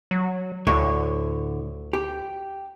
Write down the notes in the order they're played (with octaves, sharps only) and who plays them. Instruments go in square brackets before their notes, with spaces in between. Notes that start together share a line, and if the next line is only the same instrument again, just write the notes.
[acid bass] F#3
[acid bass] D2 [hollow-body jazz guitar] A2 D3 C#5
[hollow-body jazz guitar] G4